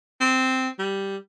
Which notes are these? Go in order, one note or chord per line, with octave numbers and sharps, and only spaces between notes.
C4
G3